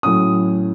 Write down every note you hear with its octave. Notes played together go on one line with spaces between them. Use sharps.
A2 F#3 C#4 D#6